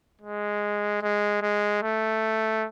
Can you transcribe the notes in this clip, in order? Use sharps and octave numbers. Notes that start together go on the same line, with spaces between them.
G#3
G#3
G#3
A3